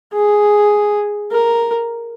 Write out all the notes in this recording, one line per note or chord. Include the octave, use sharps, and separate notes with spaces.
G#4
A#4